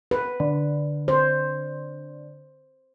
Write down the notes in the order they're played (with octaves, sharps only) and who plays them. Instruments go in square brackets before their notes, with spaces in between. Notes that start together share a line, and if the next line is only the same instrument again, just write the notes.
[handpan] B4
[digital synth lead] D3
[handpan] C5